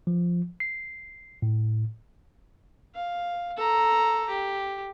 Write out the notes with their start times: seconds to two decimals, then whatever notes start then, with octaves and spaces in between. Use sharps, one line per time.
0.07 F3
0.60 C7
1.42 A2
2.95 F5
3.57 A4 A#5
4.29 G4